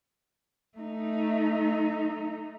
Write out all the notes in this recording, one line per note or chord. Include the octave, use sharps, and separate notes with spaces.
A3 D#4